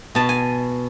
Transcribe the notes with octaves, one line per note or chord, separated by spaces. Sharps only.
B2 A5
G#5